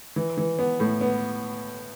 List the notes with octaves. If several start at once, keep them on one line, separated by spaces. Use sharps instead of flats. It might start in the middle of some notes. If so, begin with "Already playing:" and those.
E3
E3
B3
A2
B3